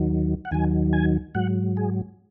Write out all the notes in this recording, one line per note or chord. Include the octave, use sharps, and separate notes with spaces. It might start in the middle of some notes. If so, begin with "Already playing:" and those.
Already playing: D#2 D#3 F#3
F#5
D#2 D#3 F#3 G#5
G#5
G#2 F#3 F#5
G#4